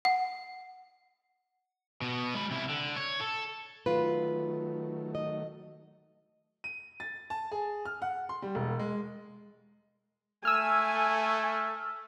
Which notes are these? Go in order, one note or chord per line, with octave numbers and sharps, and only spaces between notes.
F#5
B2 B3
G#3 B5
C3 E4
D3
C#5
A4
D#3 F#3 A3 F4 B4
D#5
D#7
A6
A5
G#4
F6
F#5
C6
G3
E1
G#3
A3 G#5 E6 F6